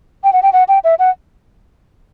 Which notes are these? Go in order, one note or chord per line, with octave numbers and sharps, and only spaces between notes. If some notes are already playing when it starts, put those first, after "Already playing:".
G5
F#5
G5
F#5
G5
E5
F#5